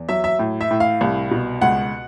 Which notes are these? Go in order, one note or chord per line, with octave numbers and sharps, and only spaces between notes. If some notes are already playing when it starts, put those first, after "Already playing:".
Already playing: E2
F#3 E5
E5
A2
E5
A2
F5
C2
B2
C#2 F#5